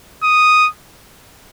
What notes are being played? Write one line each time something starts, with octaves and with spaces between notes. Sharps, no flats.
D#6